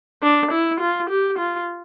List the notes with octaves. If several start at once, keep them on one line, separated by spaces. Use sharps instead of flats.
D4
E4
F4
G4
F4